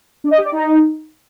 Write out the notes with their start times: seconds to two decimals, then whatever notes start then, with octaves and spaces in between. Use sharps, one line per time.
0.24 D4
0.31 D#5
0.38 G4
0.45 D5
0.52 D#4